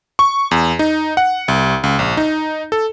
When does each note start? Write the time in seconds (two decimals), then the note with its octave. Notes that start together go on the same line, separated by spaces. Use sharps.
0.19 C#6
0.51 E2
0.79 D#4
1.17 F#5
1.48 C2
1.84 C#2
1.99 A#1
2.17 D#4
2.72 A4